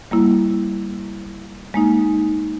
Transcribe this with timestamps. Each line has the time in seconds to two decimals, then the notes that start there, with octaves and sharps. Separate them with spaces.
0.11 G3 A#3 E4
1.74 G#3 A#3 D#4